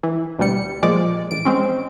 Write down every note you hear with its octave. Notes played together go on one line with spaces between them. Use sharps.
E3
D2 B2 G3 C#7
A#2 F3 G#3 D5
A1 D7
G#3 C4 C#4